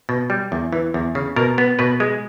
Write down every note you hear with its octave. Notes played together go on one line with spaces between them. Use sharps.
B2
G3
E2
E3
E2
C#3
B2 A#4
B3
B2 B4
G#3